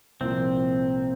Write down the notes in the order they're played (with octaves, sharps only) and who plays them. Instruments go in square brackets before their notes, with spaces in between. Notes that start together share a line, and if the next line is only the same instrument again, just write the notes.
[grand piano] C2 A#2 F3 [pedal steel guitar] C4